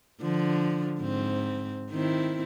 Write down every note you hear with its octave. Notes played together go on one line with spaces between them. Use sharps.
D3 F3
G#2 C4
D#3 C4 E4